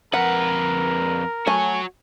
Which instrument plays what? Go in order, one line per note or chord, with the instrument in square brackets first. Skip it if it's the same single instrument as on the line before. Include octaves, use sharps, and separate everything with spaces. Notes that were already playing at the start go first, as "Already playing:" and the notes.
[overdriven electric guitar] F2 B4 [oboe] A#4 [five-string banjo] F#5
[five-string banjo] A3 G#5 [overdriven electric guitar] F#4 C#5